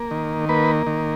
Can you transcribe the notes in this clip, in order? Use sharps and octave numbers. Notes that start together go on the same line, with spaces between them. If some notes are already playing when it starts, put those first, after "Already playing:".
Already playing: A#3
D#3
A#3 B4
D#3